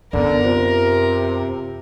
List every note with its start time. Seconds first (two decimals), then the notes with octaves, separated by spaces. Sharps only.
0.13 F#2 D3 B3 A#4 D5
0.44 C3 F4 C5